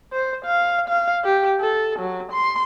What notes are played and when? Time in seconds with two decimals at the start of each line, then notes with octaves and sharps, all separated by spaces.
0.13 C5
0.45 F5
0.89 F5
1.24 G4
1.60 A4
1.99 F#3
2.32 C6